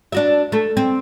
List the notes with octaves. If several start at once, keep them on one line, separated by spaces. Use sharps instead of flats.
D4 F#4 E5
A3
C4